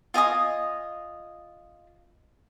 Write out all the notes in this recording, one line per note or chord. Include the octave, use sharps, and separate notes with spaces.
F4 D#5 G#5 D#6